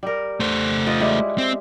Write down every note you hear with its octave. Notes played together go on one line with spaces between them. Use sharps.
G3 A#4
A3 C5
F4 D#5 G5
G3 G#3 E4
C4